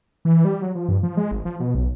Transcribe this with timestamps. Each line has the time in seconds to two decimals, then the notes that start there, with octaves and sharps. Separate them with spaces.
0.25 E3
0.45 G3
0.62 F#3
0.75 F3
0.89 G2
1.03 F3
1.17 G#3
1.31 G#1
1.45 F3
1.60 B2
1.75 B1